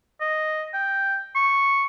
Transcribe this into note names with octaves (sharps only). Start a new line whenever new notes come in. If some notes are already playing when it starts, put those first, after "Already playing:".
D#5
G5
C#6